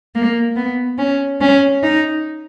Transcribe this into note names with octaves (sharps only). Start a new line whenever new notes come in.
A#3
B3
C#4
C#4
D#4